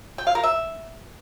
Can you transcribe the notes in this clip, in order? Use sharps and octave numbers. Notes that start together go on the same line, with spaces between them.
G5
F5
A#4
E5